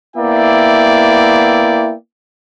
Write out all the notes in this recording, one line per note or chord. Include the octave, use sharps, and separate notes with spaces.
A#3 B3 E4 D5 E5 G5